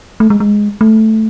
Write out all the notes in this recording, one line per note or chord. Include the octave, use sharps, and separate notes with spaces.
A3
G#3
G#3
A3